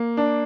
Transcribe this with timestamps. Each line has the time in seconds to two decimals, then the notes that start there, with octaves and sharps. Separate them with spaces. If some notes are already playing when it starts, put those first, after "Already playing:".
Already playing: A#3
0.17 D4